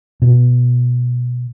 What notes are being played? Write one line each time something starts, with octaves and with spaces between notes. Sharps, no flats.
B2